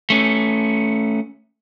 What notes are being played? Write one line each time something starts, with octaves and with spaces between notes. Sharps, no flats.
A3 C#4